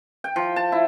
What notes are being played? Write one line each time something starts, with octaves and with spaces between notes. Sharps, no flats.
G5
F3
A5
E4